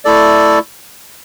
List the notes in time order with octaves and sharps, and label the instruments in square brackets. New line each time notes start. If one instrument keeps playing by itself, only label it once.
[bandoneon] A3 E4 A4 D5